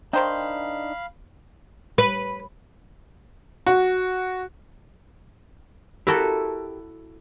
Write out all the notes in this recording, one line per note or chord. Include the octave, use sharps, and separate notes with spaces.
D#3 D4 D#4 C5 F5 G5 B5
B4
F#4
E4 F#4 G4 A4 A#4